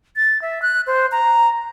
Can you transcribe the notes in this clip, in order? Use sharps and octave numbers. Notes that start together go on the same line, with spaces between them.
A6
E5
F#6
C5
A#5